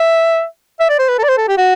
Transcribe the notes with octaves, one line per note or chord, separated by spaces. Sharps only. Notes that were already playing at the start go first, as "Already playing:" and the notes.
Already playing: E5
E5
D5
C5
B4
A4
D5
C5
A4
G4
F#4